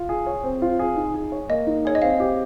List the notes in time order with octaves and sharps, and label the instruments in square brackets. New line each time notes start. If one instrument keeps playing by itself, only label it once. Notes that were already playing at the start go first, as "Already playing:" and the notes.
Already playing: [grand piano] F4
G#4
C#5
C4
F4
G#4
D#4
G#4
C#5
[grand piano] A#3 [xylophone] D#5
[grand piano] D#4
[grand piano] G#4 [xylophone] C#5
[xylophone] D#5
[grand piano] C4 [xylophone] F5
[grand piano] G4